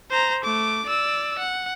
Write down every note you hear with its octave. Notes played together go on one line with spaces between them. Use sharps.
C5 A#5
A3 D6
D5 E6
F#5